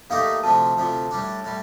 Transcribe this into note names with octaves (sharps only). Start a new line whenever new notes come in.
D#2 D#3 A3 D#4 G4 F5
D2 C3 F3 A5
D2 C3 F3
A2 G3 D4
A2 G3